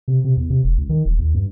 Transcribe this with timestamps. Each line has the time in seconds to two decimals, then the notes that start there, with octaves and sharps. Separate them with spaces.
0.08 C3
0.24 C3
0.37 E2
0.50 C3
0.64 E1
0.78 C#2
0.89 D#3
1.05 D#1
1.18 D#2
1.34 G2